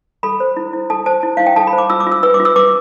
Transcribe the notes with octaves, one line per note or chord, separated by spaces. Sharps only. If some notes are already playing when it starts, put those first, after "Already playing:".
A4 B5
C5
E4
E4
A4 A5
C5 A5
E4
E4 F5
G5
A4 A5
B5
C5
D6
F4 E6
D6
F4 E6
B4 E6
D6
F4
E6
B4 D6